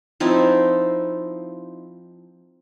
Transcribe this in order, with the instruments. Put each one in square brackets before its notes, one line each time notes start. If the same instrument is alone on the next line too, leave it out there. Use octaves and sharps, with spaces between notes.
[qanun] F3 C4 D#4 E4